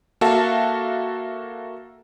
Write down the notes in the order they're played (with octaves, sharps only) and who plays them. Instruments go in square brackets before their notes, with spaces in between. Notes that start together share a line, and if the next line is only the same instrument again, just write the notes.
[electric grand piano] A#3 F#4 A4 E5 F5 A5